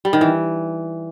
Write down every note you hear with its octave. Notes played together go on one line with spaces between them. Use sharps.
G3
D#3
E3